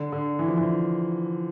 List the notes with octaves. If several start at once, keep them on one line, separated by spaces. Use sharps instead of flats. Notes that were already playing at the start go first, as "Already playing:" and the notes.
Already playing: D3
D3
E3
F3
E3